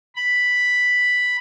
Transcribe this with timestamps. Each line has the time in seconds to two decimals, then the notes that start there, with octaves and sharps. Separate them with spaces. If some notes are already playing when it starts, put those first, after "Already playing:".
0.16 B5